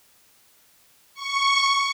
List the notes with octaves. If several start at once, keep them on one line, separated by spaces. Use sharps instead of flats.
C#6